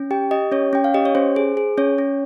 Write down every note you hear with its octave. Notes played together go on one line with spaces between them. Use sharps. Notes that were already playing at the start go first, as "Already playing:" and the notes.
Already playing: C#4
G4 G5
G4 D#5
C#4 C#5
C#4 G5
F5
G4 D#5
C#5
C#4 C5
G#4
G#4
C#4 C#5
C#4